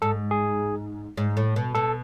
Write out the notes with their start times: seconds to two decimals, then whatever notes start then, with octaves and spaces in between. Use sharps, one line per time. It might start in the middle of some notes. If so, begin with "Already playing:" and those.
0.02 G#2 A4
0.31 G#4
1.17 G#2
1.37 A2
1.56 B2
1.75 B2 A4